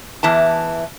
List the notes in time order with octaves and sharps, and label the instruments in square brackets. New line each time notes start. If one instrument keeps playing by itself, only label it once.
[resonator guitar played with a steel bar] E2 E3 A5